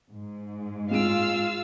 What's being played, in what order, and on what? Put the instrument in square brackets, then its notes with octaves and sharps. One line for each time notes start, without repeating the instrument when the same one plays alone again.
[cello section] G#2
[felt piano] G#3 D7 [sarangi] F4 [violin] F5 E6